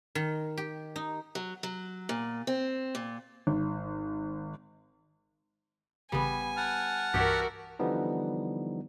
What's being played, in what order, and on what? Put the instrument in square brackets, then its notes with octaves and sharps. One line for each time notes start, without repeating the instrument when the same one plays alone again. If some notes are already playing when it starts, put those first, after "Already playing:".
[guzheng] D#3
G4
D#4
[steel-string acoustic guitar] F#3
F#3
A#2
C4
A#2
[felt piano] G#1
[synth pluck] A1 C#3 B5 [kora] G3 B3 [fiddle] G#5
[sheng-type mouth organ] F#5 A5 F6
[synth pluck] C2 G2 E3 [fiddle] F#4 A#4 [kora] G4 C#5 E5
[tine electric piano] D3 E3 F3 G3 B3 D#4